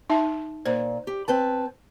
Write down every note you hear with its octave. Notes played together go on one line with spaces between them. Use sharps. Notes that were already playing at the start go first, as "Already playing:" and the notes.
D#4 E5 A5
A#2 C5
G4
C4 B4 A5